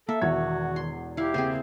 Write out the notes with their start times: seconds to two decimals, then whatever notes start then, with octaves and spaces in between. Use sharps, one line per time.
0.09 A#3 A4 E5
0.21 E1 E2 D#3 F3 F#4 C#5 G#6
0.76 C6
1.17 E4 G4 F5
1.34 C#3 A#3 C4 E4 G#4 C5